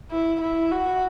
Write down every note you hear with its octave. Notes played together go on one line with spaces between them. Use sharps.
E4
E4
F#4